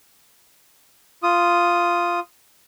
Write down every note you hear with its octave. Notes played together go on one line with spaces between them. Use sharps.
F4 D#6